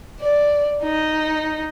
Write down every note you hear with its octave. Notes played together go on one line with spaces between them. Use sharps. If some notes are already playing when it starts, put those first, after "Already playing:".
D5
D#4